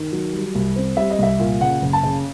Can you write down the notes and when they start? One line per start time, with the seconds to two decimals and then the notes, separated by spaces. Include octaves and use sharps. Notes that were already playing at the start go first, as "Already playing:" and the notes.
Already playing: D#3
0.12 F#3
0.33 G3
0.55 C2
0.76 C4
0.97 G3 E5
1.10 D#5
1.19 C2 E5
1.40 A#2
1.61 C#3 F#5
1.82 F#1
1.93 A5
2.03 C#3